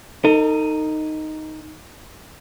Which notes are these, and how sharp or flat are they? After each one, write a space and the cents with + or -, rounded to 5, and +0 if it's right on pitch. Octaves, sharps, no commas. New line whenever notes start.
D#4 +0 A4 +45